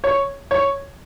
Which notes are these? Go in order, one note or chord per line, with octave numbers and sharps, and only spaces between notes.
C#5
C#5